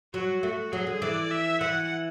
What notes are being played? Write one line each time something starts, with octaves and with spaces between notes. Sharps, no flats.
F#3 F#4
A3 F#4
F#3 G#4
D3
E3 D5
E5
E3 F#5